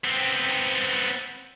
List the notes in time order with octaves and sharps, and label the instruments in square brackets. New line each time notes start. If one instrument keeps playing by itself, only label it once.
[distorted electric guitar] B3 C4